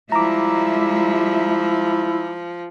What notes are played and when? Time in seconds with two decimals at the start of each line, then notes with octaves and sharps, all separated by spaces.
0.12 F3 G3 G#3 E4 E5 A#5 D6